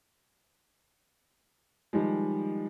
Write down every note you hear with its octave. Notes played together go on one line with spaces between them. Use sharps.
D#3 F3 G3 G#3